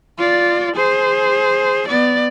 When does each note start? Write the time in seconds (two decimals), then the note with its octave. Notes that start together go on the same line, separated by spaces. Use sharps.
0.18 F4 D5
0.76 G#4 C5
1.88 B3 D5